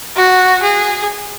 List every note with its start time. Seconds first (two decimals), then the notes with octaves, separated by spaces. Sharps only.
0.16 F#4
0.62 G#4